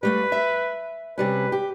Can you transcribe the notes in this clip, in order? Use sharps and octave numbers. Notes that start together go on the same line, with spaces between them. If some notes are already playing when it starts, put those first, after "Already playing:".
G3 A3 B4 F5
E5
C3 G3 C#4 B4
G4